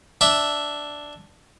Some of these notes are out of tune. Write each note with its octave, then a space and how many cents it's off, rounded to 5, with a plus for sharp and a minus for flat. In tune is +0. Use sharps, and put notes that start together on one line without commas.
D4 +0 E5 +0